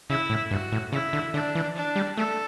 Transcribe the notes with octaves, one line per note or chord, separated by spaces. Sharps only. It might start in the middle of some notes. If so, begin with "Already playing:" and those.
C#3 E4
A2
G2 F#4
A2
C#3 E4
D3
D3 D4
E3
D4
G3
A3 A4